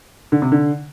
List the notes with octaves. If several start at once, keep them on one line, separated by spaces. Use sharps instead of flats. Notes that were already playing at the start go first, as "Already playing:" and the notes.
D3
C3
D3